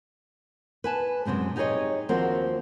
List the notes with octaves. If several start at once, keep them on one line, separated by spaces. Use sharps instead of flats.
B4 G#5 A5
F#2 A2 C3 G3 G#3
D#4 G4 G#4 A#4 C#5 D#5
D#2 F3 C4 F#4 A#4